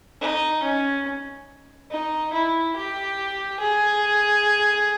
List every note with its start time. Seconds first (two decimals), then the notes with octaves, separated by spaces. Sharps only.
0.21 D#4
0.63 C#4
1.91 D#4
2.33 E4
2.76 G4
3.60 G#4